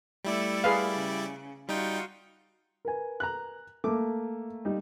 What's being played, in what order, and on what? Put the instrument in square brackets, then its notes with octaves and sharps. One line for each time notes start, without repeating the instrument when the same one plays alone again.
[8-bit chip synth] G3 E4 D5 [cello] A3 A4
[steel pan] G#4 B4 F5
[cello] C#3
[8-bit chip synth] G3 D#4 G5 [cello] F4 F#4
[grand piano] A#4 B4 G#5
[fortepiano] A#5 F#6
[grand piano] A3 A#3 [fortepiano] D6
[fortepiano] G3 D#4